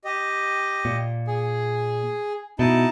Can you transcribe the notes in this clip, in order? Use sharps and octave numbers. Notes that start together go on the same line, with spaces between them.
G4 D#5
A#2
G#4
B2 D#4 E4 A5